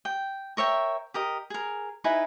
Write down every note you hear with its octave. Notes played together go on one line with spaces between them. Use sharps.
G5
A#4 C#5 E5 G5
G4 A#4 D#5
G#4 A#4
D#4 E4 B4 G#5